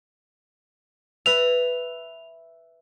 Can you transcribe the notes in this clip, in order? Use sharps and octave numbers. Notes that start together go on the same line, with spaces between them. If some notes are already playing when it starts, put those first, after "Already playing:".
B4 E5 F7